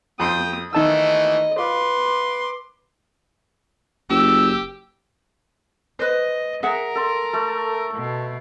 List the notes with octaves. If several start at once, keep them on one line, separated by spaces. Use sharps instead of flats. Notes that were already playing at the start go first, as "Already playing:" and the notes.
F2 G5 C6 D#6
D#3 E3 A3 D#5 A5 E6
F4 B4 C6 D6
F#1 G4 E6
B4 C5 D#5
G#4 A#4 E5 F#5
A4 C6
A3 A4
B2